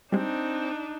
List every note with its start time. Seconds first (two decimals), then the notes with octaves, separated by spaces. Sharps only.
0.12 G3 G#3 C4 D4 D#4